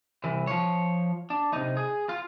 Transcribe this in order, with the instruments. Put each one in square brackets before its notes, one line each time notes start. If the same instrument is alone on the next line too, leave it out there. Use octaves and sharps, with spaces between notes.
[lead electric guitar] C2 E3
F3 C#5
D4
C3 D#4
G#4
F4